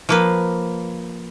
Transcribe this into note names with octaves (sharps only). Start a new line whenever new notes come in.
F3 A#3 B4